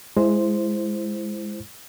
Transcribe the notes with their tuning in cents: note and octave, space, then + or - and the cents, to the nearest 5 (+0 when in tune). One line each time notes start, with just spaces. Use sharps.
G#3 +0 E4 +20 C5 +0